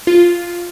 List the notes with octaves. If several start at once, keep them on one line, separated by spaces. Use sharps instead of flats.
F4